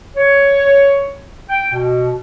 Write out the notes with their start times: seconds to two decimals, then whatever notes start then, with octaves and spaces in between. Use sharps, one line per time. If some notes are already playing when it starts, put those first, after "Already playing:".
0.16 C#5
1.49 G5
1.71 B2